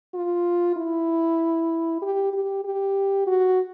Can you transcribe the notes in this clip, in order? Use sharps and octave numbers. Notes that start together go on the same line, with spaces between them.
F4
E4
G4
G4
G4
F#4